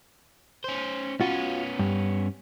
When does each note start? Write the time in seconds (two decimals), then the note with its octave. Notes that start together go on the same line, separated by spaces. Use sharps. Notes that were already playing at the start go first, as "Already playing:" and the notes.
0.64 C#4 C5
1.21 B3 C#4 F4 F#4
1.79 G2